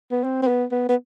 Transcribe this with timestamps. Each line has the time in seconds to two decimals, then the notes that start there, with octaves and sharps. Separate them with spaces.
0.11 B3
0.24 C4
0.42 C4
0.48 B3
0.71 B3
0.89 B3